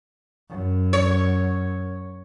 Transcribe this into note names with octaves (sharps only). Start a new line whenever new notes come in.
F#2
C#5